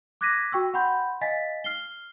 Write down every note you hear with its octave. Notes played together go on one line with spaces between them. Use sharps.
D6 F#6 G#6 A#6 B6 D#7
F#4 G5 C#6 E6
F#5 G5 B5 C6 G6
D#5 F5 G#5 A6 B6
F6 C7 G7